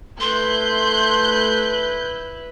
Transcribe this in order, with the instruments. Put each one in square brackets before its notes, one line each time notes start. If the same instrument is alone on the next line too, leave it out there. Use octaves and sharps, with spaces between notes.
[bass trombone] A3 [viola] E4 B4 [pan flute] C6 [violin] F#6 G6